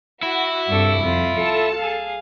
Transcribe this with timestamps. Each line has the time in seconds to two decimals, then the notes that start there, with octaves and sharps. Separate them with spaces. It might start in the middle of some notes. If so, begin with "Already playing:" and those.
0.23 E4 F#4
0.70 C2 G2 A4 C#6 D6
1.02 F2 F4
1.37 A4 A5
1.76 G#4 F5